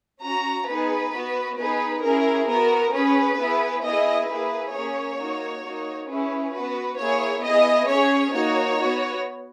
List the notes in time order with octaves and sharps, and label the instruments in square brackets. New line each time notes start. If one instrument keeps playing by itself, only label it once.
[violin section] C#4 F#4 A#5
B3 D#4 G#4 B4
B3 F#4
B3 D#4 G#4 B4
C#4 E4 G#4 A#4
B3 F#4 A#4
C#4 G#4 B4
B3 E4 G#4
B3 E4 G#4 D#5
A#3 E4 G#4 B4
A#3 C#4 G#4 C#5
A#3 D#4 F#4
A#3 D#4 F#4
C#4 E4 G#4 B4
B3 F#4 B4
A#3 E4 G#4 C#5
B3 E4 G#4 D#5
C#4 G#4 C#5
A#3 D#4 F#4 C#5
B3 F#4